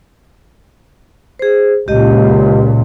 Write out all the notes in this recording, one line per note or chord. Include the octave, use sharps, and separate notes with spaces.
G#4 C5
C#2 A#2 G4 D#5